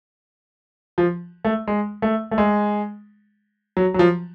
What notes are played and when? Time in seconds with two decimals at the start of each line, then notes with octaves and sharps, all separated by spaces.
0.98 F3
1.45 A3
1.68 G#3
2.02 A3
2.31 A3
2.38 G#3
3.77 F#3
3.94 F#3
3.99 F3